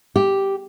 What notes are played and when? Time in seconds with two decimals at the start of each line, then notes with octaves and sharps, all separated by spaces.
0.16 G4